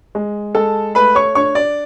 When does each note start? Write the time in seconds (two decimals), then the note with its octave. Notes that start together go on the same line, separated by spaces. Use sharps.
0.15 G#3
0.55 G#3 A4 A5
0.95 A3 B4 B5
1.15 C#5 C#6
1.35 D4 C#5 C#6
1.55 D5 D6